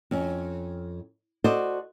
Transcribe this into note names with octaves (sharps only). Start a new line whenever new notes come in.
F2 C#4
F#4 A4 C5 D5 D#5